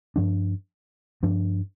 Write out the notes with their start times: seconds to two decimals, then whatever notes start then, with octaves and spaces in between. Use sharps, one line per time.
0.16 G2 F3 D4
1.23 G2 F3 D4